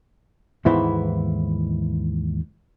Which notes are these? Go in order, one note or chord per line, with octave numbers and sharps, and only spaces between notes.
D#2 G#2 E3 B3 E4 C5